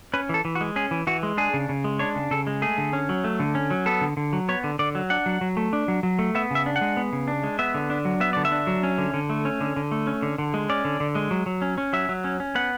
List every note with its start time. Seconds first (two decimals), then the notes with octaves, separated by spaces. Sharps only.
0.13 C#4 B4
0.29 E3 A4
0.45 E3
0.55 F#4
0.61 G#3
0.76 C#4 G#4
0.91 E3
1.07 E3 F#4
1.23 G#3
1.37 D4 G#4
1.54 C#3
1.69 C#3
1.84 G#3
1.99 D4 C#5
2.16 C#3
2.31 C#3 A4
2.47 G#3
2.62 A3 G#4
2.78 D3
2.93 C#4
3.09 F#3
3.24 A3
3.40 D3
3.55 C#4
3.71 F#3
3.86 B3 A4
4.01 D3
4.17 D3
4.33 F#3
4.49 B3 C#5
4.64 D3
4.79 D3 D5
4.95 F#3
5.10 D4 F#5
5.26 F#3
5.41 F#3
5.57 A3
5.73 D4
5.88 F#3
6.03 F#3
6.19 A3
6.35 B3 E5
6.51 C#3 E5
6.66 D4
6.76 F#5
6.81 G#3
6.97 B3
7.13 C#3
7.28 D4
7.44 G#3
7.59 B3 E5
7.74 D3
7.90 D4
8.05 F#3
8.20 B3 E5
8.33 D3 D5
8.45 E5
8.52 D4
8.67 F#3
8.83 C#4
8.98 D3
9.14 D3
9.30 A3
9.45 C#4
9.61 D3
9.76 D3
9.92 A3
10.07 C#4
10.22 D3
10.38 D3
10.54 G#3
10.69 C#4 D5
10.85 D3
11.00 D3
11.15 G#3
11.31 F#3
11.46 F#3
11.62 C#4
11.78 C#4
11.93 F#3 E5
12.09 F#3
12.24 C#4
12.40 C#4
12.55 B3 F#5